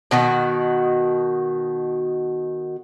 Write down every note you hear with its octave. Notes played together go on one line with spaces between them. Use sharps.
B2 D#3 F#4